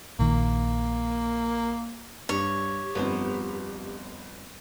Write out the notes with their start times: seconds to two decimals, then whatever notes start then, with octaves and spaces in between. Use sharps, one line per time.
0.19 A#1 D#3 A#3
2.29 G2 G4 C#5
2.95 G1 F2 B3 A#4 C5